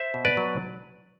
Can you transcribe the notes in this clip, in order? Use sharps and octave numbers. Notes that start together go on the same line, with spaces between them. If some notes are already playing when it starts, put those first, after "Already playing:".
Already playing: C5 E5
B2
B4 D5
F#3